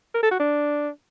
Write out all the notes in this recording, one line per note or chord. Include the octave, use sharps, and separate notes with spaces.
A#4
A4
F#4
D4